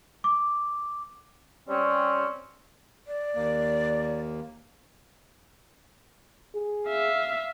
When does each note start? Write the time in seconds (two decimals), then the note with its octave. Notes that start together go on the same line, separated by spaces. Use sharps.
0.24 D6
1.69 G3 C4 C#4
3.07 D5
3.35 D#2 A#3
6.55 G#4
6.88 E5 F5